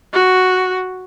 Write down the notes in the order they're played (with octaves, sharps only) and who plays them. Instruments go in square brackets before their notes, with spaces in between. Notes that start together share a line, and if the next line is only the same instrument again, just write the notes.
[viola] F#4